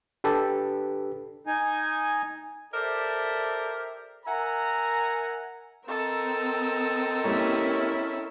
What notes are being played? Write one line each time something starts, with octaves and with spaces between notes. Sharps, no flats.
D4 G4 A4 B4
D#4 G#5
G4 A4 A#4 C5 D5 E5
A#4 E5 F#5 G#5 A#5
C4 A4 A#4 D#5 E6
G3 A#3 C#4 E4 C#5